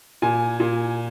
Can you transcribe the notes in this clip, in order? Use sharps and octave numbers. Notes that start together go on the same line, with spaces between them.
A#2 G#5
A#2